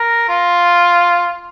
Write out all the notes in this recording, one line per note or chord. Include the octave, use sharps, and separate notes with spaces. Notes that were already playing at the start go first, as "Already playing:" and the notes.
Already playing: A#4
F4